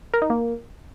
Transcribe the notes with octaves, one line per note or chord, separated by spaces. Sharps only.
A#4
D#4
A#3